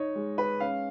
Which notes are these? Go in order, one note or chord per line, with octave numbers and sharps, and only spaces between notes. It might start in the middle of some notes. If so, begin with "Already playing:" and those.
Already playing: D#4 C#5 D#5
G#3
B4
C#4 F5